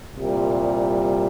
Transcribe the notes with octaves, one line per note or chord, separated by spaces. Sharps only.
C2 A#2 G3